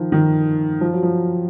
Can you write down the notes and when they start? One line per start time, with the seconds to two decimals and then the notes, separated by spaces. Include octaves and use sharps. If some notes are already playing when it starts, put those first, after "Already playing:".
Already playing: D#3 F3
0.12 D#3
0.81 F3
0.93 F#3
1.03 F3